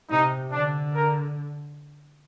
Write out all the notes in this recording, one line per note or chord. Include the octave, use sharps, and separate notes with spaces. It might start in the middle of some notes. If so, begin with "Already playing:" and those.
C3 D#4
D3 D4
A#4